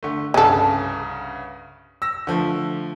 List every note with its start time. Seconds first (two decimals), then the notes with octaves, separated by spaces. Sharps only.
0.03 D3 A3
0.34 C2 G2 C#3 C#4 A4
2.02 E6 A#6
2.27 D3 F3 A3